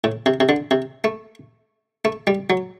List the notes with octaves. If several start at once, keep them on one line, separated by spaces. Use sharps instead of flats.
A2
C3
C3
D3
C3
A3
A3
G3
F#3